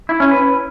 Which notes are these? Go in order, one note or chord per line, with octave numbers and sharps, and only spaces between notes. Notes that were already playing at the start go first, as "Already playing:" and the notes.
E4
C#4
B4